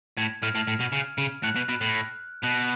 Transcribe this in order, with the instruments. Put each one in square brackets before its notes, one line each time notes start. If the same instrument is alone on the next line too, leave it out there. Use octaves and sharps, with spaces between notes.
[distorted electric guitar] A2 [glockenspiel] G#6
[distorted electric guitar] A2 [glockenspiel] F6
[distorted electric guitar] A2
A2
B2
C#3
C#3
[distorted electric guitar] A2 [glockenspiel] F#6
[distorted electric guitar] B2
B2
A2
[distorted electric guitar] B2 [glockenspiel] F#6